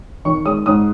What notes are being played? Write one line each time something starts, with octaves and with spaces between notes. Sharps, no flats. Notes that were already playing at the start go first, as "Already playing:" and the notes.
D#3 C#6
G#3 D#6
G#2 D#6